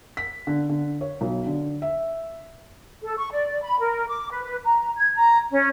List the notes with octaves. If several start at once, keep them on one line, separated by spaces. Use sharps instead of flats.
B6
D3
D3
C#5
B1
D3
E5
A4
C#6
D5
B5
A#4
D6
B4
B4
A#5
G#6
A#5
C#4